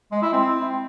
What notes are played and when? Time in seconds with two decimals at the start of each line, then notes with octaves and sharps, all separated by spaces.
0.12 G#3
0.22 E4
0.33 C4